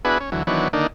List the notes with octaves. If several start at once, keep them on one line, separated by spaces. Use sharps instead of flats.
B3 D4 E4 F#4 G#4 B4
C#4
D2 E3 F#3
D#3 E3 F#3 B3 D4 C#5
D3 D#3 A#3 D4 D#4